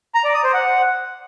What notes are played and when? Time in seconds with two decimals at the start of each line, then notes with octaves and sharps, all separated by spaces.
0.14 A#5
0.24 D5
0.34 D#6
0.44 C5
0.54 F#5